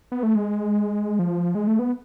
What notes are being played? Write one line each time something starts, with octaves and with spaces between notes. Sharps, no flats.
B3
A3
G#3
F3
G#3
A3
B3